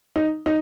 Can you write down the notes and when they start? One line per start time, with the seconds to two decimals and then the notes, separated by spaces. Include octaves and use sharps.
0.16 D#4
0.46 D#4